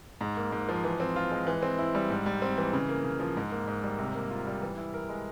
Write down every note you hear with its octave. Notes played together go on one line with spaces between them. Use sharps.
G#2
A#3
G#2
F3
E3
C4
F4
G#3
E3
C4
E4
G3
G#2
G3
C4
E3
C#3
A#3
C#3
F3
G#2
A#3
G#2
G3
C3
A#3
F4
G3
E3
E4
A#4
G#3